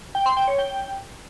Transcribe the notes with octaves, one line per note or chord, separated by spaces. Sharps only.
G5
C6
G5
C#5
G5